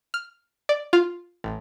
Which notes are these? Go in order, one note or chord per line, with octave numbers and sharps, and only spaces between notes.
F6
D5
F4
A1